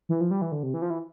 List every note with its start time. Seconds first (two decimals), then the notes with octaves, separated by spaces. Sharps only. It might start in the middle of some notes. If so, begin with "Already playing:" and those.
0.09 E3
0.21 F3
0.31 G3
0.42 E3
0.52 D3
0.63 C3
0.74 E3
0.82 F3
0.90 E3